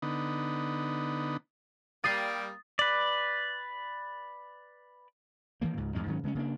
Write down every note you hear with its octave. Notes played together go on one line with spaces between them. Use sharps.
D3 B3 D#4
G3 A#3 D#6 A6 C7
B4 D5
D#3 E3 G3 A#3
C#2 G#2
E2 G2 G#3
G#2 D#3 F#3 C#4
C#3 G#3 A3 C#4
C#3 A#3 D4